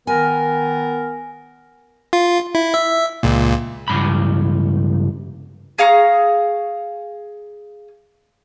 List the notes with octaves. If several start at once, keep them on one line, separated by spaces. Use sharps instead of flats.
D#3 B3 A#4 G#5
F4
E4
E5
C#2 A#2
C#2 G2 B5
G#4 F5 A#5 C#6